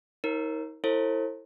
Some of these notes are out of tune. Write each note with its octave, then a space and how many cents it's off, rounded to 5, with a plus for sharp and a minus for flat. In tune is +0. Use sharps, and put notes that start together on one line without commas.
D#4 +35 A#4 +0 C#5 -40
E4 +0 A4 +30 C5 +35